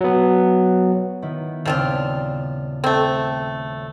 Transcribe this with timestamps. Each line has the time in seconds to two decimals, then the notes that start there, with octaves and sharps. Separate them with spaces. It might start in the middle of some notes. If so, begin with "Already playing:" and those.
0.01 F#3 B3
1.22 D#3 B3 E4
1.65 D#1 C#3 F3 C4 F4 D5
2.84 A3 C4